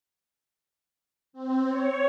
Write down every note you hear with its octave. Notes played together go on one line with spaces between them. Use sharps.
C4
C#5